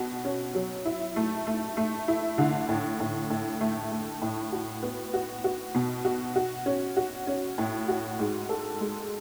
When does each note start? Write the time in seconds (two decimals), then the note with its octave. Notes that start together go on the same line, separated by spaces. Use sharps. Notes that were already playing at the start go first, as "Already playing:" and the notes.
Already playing: B2 F#4
0.25 C#4
0.55 F#3
0.85 E4
1.16 A3
1.47 A3
1.77 A3
2.08 E4
2.38 D3
2.69 A2
3.00 A2
3.30 A2
3.61 A3
3.91 A3
4.22 A2
4.52 F#4
4.83 B3
5.14 F#4
5.44 F#4
5.75 B2
6.05 F#4
6.36 F#4
6.66 C#4
6.97 F#4
7.27 C#4
7.58 A2
7.88 F#4
8.19 G#2
8.49 A4
8.80 G#3